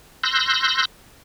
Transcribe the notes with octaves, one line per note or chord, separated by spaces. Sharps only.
C6 E6 F#6 G6 A#6